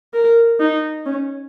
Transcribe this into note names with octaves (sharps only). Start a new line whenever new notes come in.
A#4
D#4
C#4